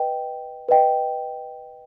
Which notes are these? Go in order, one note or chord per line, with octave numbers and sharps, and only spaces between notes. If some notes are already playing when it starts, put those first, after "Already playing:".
Already playing: B4 D#5 G5
B4 D#5 G5